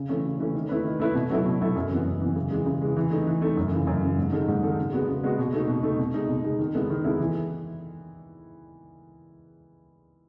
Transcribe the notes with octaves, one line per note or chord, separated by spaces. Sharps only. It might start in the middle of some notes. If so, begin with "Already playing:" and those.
Already playing: C#3
E3 A3 C#4
C#3
E3 A3 C#4
D#3
A3 E4 B4
D#3
A3 E4 B4
B2
F#3 A3 E4 A4
B2
F#3 A3 E4 A4
F#2
E3 B3
F#2
E3 B3
C#3
E3 G#3
C#3
E3 G#3
E3
A3 D#4
E3
A3 D#4
F#2
C#3 E3
F#2
C#3 E3
G#2
D#3 G#3 D#4 A4
G#2
D#3 G#3 D#4 A4
C#3
G#3 B3 F#4
C#3
G#3 B3 F#4
B2
A3 D#4
B2
A3 D#4
B2
G#3 D#4
B2
G#3 D#4
D#3
G#3 B3 E4 A4
D#3
G#3 B3 E4 A4
E3